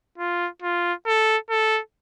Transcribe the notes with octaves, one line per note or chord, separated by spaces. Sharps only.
F4
F4
A4
A4